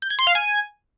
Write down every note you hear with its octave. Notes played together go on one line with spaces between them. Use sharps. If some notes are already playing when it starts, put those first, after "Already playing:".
G6
G#6
C6
F5
G#5